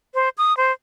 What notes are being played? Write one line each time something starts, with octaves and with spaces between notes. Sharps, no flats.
C5
D#6
C5